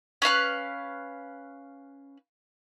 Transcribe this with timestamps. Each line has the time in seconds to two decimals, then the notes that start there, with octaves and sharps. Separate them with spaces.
0.22 C#4 B4 F5 F#6